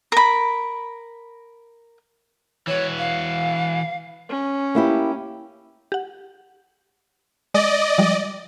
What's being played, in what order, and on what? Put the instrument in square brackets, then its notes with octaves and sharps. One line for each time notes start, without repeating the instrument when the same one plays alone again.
[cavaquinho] A#4 B5
[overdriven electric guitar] E3 F#4 [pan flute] C#5
[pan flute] F5
[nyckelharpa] C#4
[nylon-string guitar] A#3 E4 G4
[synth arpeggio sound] G4 F#5
[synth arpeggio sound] G#3 [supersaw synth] D5 D#5
[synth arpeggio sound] F3 G3 G#3